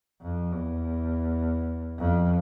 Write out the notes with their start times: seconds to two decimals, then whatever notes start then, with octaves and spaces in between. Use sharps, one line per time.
0.22 F2
0.52 E2
1.98 F2